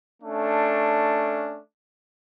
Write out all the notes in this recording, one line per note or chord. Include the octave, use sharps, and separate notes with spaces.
A3 C#4 D4